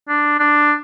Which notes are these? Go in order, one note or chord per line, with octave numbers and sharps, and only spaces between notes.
D4
D4